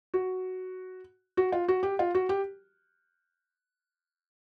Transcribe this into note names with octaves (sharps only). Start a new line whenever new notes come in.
F#4
F#4
F4
F#4
G4
F4
F#4
G4